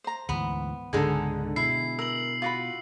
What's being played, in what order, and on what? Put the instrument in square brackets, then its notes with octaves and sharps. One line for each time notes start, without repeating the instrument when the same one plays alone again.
[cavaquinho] C5 A#5
[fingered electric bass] D2 G#2 E3 [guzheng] B3
[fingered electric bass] C#2 G#2 [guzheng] D3 G#3 D#4 [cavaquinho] G#4 A4
[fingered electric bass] B2 [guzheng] E4 [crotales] C7
[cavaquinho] A#4 [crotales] E6 F#7
[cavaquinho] F4 F#4 B5